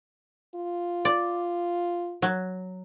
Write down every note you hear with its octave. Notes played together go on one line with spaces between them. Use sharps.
F4
D5
F#3